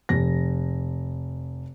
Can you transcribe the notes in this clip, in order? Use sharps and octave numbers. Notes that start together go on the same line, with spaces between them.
F1 A#6